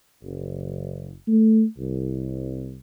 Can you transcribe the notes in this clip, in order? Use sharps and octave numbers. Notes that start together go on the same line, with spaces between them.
F#1
A3
C2